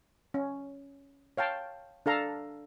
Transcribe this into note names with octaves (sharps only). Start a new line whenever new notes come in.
C#4
C#5 F5 G5 A5
D4 A4 F5 A#5